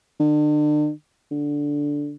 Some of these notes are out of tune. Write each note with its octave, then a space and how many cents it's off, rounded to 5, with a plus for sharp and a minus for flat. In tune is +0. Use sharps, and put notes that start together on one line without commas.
D3 +40
D3 -5